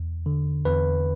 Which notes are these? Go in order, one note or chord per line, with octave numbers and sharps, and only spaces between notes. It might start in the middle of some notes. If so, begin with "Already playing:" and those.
Already playing: E2
D3
E2 B4